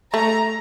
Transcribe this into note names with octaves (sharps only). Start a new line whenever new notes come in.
A3 A#5